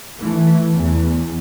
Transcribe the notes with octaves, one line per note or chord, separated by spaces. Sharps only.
E3 A3
E2